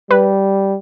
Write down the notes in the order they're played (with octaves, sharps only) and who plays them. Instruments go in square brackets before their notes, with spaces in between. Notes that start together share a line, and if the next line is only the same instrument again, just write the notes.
[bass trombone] G3 [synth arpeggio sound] B4